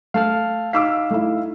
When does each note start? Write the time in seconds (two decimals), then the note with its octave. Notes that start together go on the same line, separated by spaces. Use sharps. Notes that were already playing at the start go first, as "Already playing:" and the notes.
0.14 A3 F5 A5 F6
0.73 D#4 F5 D6 E6 B6
1.11 A3 E4